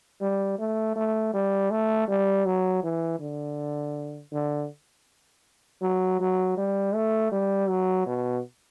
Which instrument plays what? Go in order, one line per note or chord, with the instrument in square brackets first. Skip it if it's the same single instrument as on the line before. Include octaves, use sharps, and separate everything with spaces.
[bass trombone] G3
A3
A3
G3
A3
G3
F#3
E3
D3
D3
F#3
F#3
G3
A3
G3
F#3
B2